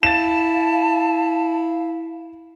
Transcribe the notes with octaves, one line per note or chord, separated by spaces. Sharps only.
E4 F5 A5 A6 E7